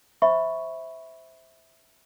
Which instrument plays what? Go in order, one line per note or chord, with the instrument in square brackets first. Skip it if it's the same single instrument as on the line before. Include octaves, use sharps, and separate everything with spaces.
[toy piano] C5 E5 B5 C#6